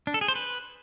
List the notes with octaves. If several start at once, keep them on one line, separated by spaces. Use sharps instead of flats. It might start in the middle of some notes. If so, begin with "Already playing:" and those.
D4
A4
G#4
C5
B4